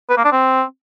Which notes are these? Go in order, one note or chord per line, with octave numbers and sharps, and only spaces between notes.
B4
A#3
D4
C4